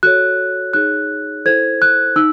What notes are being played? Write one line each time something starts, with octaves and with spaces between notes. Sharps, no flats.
F#4 A4 C#5 F#6
D#4 G#4 C#5 F#6
E4 A4 C5 G#6
F#6
D#4 E6